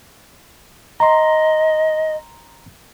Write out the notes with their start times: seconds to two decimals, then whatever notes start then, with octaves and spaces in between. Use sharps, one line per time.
1.00 D#5 A#5 C6